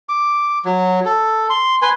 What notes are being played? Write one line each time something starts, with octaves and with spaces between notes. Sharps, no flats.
D6
F#3
A4
C6
B4 G#5 C6